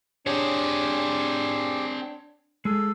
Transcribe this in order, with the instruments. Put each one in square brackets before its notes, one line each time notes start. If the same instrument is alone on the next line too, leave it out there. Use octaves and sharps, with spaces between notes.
[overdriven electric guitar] C4 G#4 [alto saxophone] D4 [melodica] G4 [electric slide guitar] C#5
[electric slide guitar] G#3 G#4 [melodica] A4